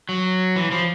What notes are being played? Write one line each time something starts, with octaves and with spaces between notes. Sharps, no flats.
F#3
E3
F3